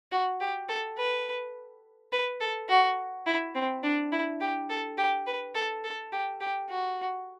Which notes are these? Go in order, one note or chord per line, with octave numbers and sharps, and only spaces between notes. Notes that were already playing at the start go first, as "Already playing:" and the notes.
F#4
G4
A4
B4
B4
A4
F#4
E4
C4
D4
E4
G4
A4
G4
B4
A4
A4
G4
G4
F#4